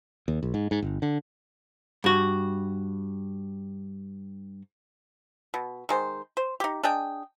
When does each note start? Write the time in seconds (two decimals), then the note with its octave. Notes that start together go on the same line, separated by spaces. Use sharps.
0.28 D#2
0.43 B1
0.54 G#2
0.71 G#2
0.82 G1
1.02 D3
2.04 G2 F#4
5.54 B2
5.89 D#3 G#3 C5
6.37 C5
6.60 D#4 G4
6.83 D4 G#4 D#5 G5